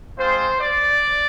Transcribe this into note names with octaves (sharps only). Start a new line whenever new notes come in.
G#3 C4 F4 C5
D5